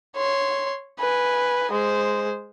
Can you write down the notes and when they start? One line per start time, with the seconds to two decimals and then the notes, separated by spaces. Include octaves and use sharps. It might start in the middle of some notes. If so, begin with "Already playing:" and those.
0.16 C#5 C6
0.99 B4 G#5
1.72 G#3 C5